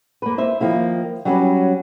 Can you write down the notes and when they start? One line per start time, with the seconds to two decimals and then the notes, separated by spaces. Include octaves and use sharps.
0.22 A#3 B4
0.38 C5 E5
0.60 D#3 F3 A#3 E4
1.25 F#3 G3 B3 C#4